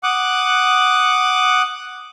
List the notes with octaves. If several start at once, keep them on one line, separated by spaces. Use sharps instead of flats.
F#5 D6 D#6 F#6